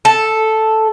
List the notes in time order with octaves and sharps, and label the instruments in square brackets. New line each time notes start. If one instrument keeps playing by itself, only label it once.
[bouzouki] A4